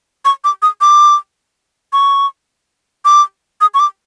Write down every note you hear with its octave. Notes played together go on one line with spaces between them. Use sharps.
C#6
D6
D#6
D6
C#6
D6
D#6
C#6
D6